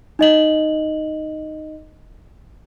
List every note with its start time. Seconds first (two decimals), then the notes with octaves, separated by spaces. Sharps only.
0.19 D#4 D#5 F#7